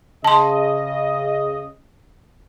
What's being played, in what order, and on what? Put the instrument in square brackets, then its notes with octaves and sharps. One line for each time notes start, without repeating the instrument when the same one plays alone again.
[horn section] C#3 D#5 [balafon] A5 C6